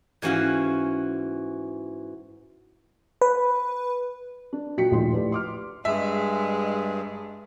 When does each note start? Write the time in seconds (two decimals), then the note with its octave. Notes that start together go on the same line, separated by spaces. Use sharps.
0.22 G#2 E3 C#4 F#4 F5 G5
3.21 B4
4.53 D4
4.77 A#2 F#3 F#4 G5 B6 C#7
4.91 D#1 A#1 F3 A3 D#4 C6
5.12 A2 G4 B4 D5
5.32 C6 D6 F6
5.85 G2 G#3 E5